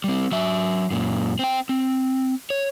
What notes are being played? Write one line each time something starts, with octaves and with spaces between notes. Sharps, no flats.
G3 C4
F#3 E5
F#2 A#2
C4 G5
C4
C#5